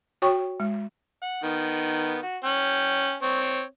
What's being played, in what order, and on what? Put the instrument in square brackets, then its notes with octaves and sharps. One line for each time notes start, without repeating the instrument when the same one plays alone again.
[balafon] F#4 C#5 G5 C#6
G#3
[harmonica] F#5
D#3 B3
F#4
C#4 G5
C4 C#5